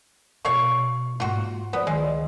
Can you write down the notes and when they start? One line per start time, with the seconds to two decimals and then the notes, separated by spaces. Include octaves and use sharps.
0.45 B2 B3 C#5 F5 C#6
1.20 G#2 A#3 F4 F#4
1.73 F#3 B3 C5 D5
1.87 C#2 D#3 G#3